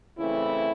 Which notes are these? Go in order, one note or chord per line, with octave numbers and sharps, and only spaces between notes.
C#3 E3 A3 C4 E4